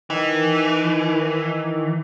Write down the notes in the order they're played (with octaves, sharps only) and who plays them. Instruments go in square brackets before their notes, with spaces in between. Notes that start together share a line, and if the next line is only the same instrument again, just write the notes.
[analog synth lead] D#3 [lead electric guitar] E3